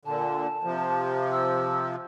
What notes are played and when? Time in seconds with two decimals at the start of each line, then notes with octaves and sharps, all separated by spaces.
0.05 A#2 D3 A5
0.64 C3 F3
1.32 E6